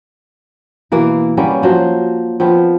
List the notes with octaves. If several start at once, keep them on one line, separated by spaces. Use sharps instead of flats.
B2 E3 A#3
G3 A#3 B3 C#4
F3 F#3 C5
F3 B3 C4 F4